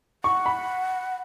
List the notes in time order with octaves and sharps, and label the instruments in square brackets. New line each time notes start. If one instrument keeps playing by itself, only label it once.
[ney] F#5 [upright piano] C#6
[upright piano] B5